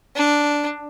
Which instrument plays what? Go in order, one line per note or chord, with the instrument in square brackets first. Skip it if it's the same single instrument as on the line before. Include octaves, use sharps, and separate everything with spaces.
[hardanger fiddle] D4